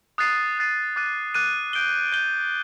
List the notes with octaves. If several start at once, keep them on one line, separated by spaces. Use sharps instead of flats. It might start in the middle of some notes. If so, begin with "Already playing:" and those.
D#6 F#6 A6 C7 D#7
D#6 F#6 A6 C7 D#7
D6 F#6 A6 D#7
D6 F#6 A6 D#7
G6 D7 G7
G6 D7 G7